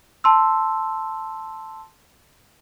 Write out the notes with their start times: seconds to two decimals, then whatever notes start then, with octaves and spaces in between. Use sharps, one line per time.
0.24 A5 C6 E6